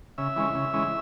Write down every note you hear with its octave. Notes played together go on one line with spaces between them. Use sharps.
C#3 E5
E3 G#3 C#4
C#3
E3 G#3 C#4